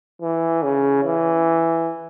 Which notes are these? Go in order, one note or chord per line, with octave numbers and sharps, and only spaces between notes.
E3
C#3
E3